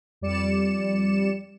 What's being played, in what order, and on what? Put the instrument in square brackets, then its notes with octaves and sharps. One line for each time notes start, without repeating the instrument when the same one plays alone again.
[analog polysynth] F2 G3 D5 C#7 E7